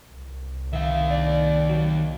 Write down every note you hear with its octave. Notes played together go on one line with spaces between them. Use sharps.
C2
D#3 E5 F5
D5
F#3